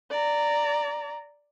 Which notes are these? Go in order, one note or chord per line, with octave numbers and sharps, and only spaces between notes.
D5 A#5